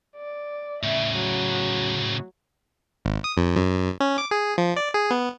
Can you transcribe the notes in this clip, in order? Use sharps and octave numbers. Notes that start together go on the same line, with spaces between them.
D5
A2 C#3 E5
F#3
G#1
D#6
F2
F#2
C#4
D6
G#4
F3
D5
G#4
B3